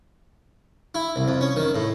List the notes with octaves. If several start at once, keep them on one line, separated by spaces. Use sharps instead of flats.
E4
C2
F2
C#4
D#3
A2